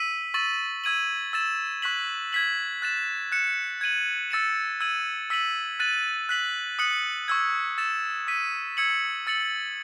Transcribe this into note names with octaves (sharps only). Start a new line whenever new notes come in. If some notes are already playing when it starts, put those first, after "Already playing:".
Already playing: E6 B6 D#7 F#7
C#6 E6 A6 D#7 F#7
E6 G#6 D#7 F#7
E6 A6 E7
C#6 F#6 B6 F#7
G#6 B6 F#7
F#6 A6 E7
F#6 C#7 E7
G#6 D#7 F#7
E6 A6 C#7 E7
E6 G#6 D#7 F#7
E6 B6 D#7 F#7
F#6 A6 D#7 F#7
F#6 B6 F#7
D#6 F#6 C#7 F#7
C#6 E6 G#6
E6 A6 E7
E6 B6 D#7
E6 G#6 C#7 F#7
E6 A6 C#7 F#7